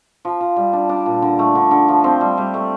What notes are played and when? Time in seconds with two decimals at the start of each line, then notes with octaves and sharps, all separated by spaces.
0.25 F3
0.40 F3
0.56 G3
0.73 D4
0.89 D4
1.06 A#2
1.22 D3
1.39 A3
1.55 D3
1.71 D3
1.88 F3
2.04 C4
2.21 G3
2.38 G3
2.54 A3